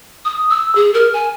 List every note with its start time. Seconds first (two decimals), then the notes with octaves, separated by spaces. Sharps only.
0.25 D#6
0.50 E6
0.75 G#4
0.94 A#4
1.14 G#5